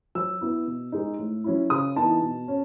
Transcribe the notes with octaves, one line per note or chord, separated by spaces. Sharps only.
F#3 E6
B3 E4
B2
G#3 D#4
A2
F#3 C#4 E4
C#3 D#6
E3 B3 D#4 A5
B2
C#4